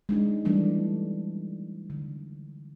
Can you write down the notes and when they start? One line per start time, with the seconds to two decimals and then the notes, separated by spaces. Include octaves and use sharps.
0.09 G#3 D4 D#4
0.45 E3 G3 A3 D4
1.90 D3